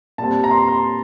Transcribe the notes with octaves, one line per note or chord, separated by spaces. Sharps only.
A#2 G3 C4 A5
A#5
C6
A#5
C6